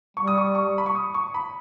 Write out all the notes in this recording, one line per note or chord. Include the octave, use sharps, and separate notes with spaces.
G3 C#6
D#6
C#6
C#6
B5
C#6
D#6
C#6
B5